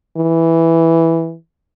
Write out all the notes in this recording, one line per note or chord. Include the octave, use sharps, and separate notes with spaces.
E3